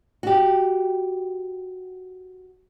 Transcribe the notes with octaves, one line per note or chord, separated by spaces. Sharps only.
F#4 G4